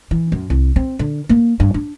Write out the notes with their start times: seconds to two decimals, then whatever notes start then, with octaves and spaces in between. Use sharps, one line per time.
0.11 E3
0.32 F#2
0.50 C2
0.76 C4
0.99 D3
1.29 A#3
1.60 G2
1.74 D4